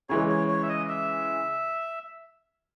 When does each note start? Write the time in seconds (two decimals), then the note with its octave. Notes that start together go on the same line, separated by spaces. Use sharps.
0.09 C#3 E3 G#3 C#5
0.29 C#5
0.48 C#5
0.63 E5
0.69 D#5
0.89 E5